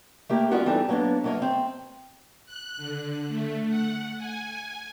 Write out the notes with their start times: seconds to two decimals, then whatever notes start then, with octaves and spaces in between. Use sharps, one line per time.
0.29 A3 A#3 G4
0.51 G3 B3 C#4 F4 F#4 A#4
0.66 E3 G3 C4 D#4 E4 A4
0.89 F#3 A#3 B3 C#4 D4
1.24 F#3 A3 A#3 C#5 D#5
1.40 A3 C4
2.46 F#6
2.77 D3
3.28 A3
3.69 F#5
4.18 G#5